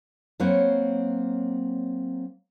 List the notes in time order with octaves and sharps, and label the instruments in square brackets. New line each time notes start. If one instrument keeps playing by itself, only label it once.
[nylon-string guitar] F#3 A#3 C4 B4 C#5